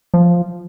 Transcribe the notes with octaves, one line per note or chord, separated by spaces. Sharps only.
F3